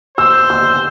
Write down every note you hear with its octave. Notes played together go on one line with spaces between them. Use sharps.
C5 E6
E6